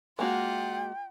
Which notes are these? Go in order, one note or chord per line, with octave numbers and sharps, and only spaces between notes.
G#3 A#3 F4 F#4 F#5 G5